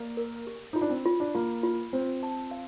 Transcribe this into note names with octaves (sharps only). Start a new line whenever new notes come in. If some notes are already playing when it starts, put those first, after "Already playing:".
Already playing: A#3 D5
A#4
G4
D#4 F4
D4
C4
F4
D4
A#3 F4
F4
C4 C5
A5
F5